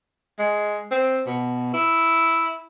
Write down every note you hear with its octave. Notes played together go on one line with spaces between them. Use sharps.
G#3
C4
B2
E4